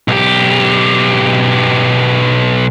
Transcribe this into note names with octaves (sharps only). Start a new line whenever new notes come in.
B1 G4